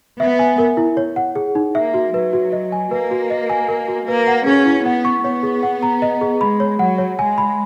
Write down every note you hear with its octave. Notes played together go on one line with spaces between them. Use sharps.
B3 E5
G#5
A#4
E4
C#5
F#5
G#4
D#4
A#3 E5
F#4
F#3 B4
F#4
D#5
G#5
A#3 B4
F#4
D#5
G#5
A#4
F#4
A#3 B4
F#5
C#4 G#4
E4
B3 F#5
C#6
B3 C#5
G#4
F#5
A#5
D#5
G#4
G#3 B5
C#5
F#3 F#5
C#5
G#3 G#5
B5